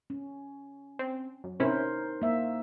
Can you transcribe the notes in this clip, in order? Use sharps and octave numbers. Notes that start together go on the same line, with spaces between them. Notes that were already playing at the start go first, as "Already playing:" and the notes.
C#4
C4
F#2
C3 C#4 D#4 E4 A#4 C5
A#3 E5